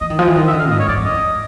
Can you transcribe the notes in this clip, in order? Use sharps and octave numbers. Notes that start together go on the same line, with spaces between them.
E3 D#5
D#3
F3 D#5
E3
D#3 D#5
E5
D3
F5
G#2 D#5
C#5
G2 D5
F2
D#5